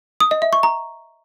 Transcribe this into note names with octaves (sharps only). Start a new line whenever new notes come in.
D#6
D#5
E5
C#6
A#5